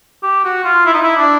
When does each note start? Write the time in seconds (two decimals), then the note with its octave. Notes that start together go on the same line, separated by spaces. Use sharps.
0.23 G4
0.44 F#4
0.64 F4
0.86 E4
0.94 D#4
1.03 E4
1.17 D4